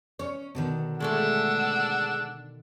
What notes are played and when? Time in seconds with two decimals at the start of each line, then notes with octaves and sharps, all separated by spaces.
0.19 C#4 C#5
0.55 B2 D3 D#3
1.00 G#3 A3 D4 A4 F#5 E6